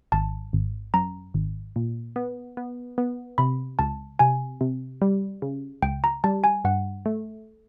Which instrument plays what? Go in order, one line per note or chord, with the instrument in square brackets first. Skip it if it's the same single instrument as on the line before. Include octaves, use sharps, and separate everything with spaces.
[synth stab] G#1 [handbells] A5
[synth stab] G#1
[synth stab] F#2 [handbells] A#5
[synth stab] G#1
A#2
B3
B3
B3
[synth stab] C3 [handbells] B5
[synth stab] C#2 [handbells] A5
[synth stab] C3 [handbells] G#5
[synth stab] C3
G3
C#3
[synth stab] C#2 [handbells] G5
[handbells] A#5
[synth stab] G3 [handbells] A5
[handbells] G#5
[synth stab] G2 [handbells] F#5
[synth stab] A3